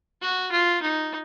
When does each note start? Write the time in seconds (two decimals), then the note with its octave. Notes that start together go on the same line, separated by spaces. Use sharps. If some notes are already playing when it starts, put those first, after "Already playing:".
0.22 F#4
0.52 F4
0.82 D#4